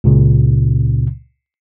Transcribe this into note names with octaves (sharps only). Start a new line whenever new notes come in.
C#2 A#2 C#3